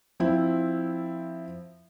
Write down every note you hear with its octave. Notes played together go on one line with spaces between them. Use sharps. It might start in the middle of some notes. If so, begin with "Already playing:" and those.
F3 C4 E4